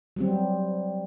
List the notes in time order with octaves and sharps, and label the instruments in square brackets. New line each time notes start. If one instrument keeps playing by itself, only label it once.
[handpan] F#3 G3 C4